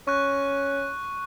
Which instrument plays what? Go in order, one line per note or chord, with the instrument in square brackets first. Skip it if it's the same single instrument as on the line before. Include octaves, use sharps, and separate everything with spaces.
[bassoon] C#4 [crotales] C#6 F#6